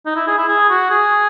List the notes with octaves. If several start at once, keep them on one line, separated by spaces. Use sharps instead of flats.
D#4
E4
G#4
E4
G#4
F#4
G#4